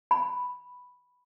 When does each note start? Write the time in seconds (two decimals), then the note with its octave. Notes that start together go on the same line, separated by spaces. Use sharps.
0.11 B5